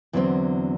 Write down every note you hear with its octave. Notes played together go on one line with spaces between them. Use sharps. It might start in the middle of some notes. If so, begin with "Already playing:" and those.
E2 D3 F#3 C4